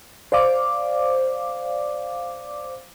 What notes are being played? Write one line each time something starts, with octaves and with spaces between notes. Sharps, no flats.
C5 D5 F5 D6